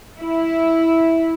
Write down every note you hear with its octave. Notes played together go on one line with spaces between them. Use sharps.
E4